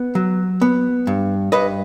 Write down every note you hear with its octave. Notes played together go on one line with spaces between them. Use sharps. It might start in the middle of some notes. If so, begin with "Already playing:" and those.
Already playing: B3
F#3
B3
G2
G2 B4 D#5